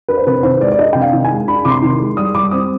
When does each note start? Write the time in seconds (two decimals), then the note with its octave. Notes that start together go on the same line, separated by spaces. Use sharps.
0.08 D4 B4
0.18 C5
0.27 C3 B4
0.43 D#3 C5
0.60 G#3 D5
0.72 D5
0.79 D4 D#5
0.93 C3 G5
1.01 F5
1.12 D#3
1.24 G#5
1.31 G#3
1.48 D4 B5
1.65 C3 D6
1.71 C6
1.82 D#3
2.00 G#3
2.17 G3 D#6
2.35 G3 D6
2.51 C4 D#6